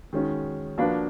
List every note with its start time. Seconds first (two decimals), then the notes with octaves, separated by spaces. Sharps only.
0.13 D#3 G#3 C#4 F#4
0.78 F3 A#3 D4 F#4 B4